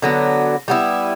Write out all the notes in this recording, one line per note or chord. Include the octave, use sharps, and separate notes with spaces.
D3 F#3 B3
G3 B3 E4